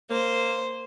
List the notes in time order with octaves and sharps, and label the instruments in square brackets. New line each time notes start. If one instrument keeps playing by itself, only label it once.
[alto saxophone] A#3 [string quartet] C5